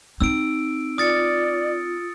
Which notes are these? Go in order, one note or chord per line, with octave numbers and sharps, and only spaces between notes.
C4 D#4 E6 D7
F4 D5 D#6 A6 C#7